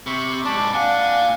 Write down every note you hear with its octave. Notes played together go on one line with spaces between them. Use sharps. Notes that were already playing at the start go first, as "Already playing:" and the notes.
C3 B5 C#6
G#2 D4 A5 B5 D6
A#2 D4 F5 F#5 G#5